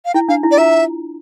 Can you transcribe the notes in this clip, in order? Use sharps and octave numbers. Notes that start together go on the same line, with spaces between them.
F5
E4 G5
D4 F5
E4
D5
F4 E5